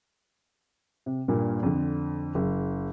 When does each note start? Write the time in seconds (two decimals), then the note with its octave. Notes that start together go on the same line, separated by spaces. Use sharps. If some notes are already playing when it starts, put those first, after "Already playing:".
1.06 C3
1.28 G2 A#2 A#3
1.63 F2 D3
2.35 F#1